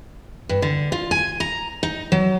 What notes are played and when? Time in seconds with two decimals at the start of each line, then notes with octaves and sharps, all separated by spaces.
0.49 G2
0.62 D3
0.92 F4
1.11 G#5
1.40 A#5
1.83 D#4
2.12 F#3